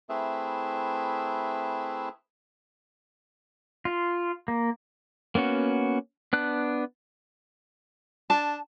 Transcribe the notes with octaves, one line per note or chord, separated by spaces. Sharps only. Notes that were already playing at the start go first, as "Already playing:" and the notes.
A3 C4 E4 G#4 B4 E5
F4
A#3
A#3 B3 C#4 F#4
B3 D4 F#6
D4 A5